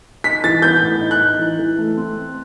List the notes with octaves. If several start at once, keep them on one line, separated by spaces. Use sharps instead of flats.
D#4 B6
E3 A6
B3 G6
A2
D#4
F#6
D#4
E3
E3
A3
C4